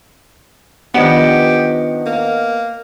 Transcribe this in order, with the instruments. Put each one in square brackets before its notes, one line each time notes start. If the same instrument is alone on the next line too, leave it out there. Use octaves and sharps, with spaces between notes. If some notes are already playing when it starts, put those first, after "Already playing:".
[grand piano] D#3 F3 D4 [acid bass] B3 [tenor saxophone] G4 [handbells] D#5 F#5
[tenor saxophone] A#3